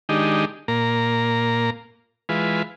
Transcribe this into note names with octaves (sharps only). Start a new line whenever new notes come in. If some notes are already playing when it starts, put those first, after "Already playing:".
D#3 G#3 D4 D#4 G4
A#2 A#3 A#5
E3 G#3 F4 B4